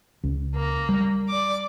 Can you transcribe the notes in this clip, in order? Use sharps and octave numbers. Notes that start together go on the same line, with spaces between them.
C#2
A#3
G3
D5 D6